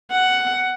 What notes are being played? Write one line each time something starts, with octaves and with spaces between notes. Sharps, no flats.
F#5